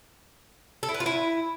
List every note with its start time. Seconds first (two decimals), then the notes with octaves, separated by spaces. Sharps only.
0.83 A4
0.89 E4
0.94 B4
1.00 F4
1.06 E4